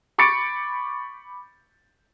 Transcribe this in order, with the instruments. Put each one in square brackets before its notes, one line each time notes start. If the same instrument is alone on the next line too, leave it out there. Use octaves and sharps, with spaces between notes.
[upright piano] B5 C#6 D6 A6 C#7 D7